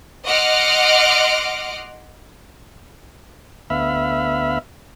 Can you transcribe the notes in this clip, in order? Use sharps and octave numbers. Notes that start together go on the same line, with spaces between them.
D#5 F#5 C6 D6 F6
D2 B3 E5 F5 B5